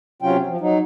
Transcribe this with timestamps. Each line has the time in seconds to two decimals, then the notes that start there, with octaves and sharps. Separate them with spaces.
0.22 C3 F#3 C#4 F4 G5
0.46 F3
0.61 F#3 D#4